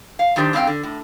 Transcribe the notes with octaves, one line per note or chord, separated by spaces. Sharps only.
F5
F#2 D#3 D4 G4 C5
G2 C#3 C4 C#4 F5 G5
D3
A2